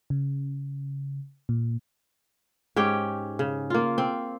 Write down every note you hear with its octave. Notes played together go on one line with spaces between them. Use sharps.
C#3
A#2
G#2 C#4 G4 G5
C#3
A#3 F4
C4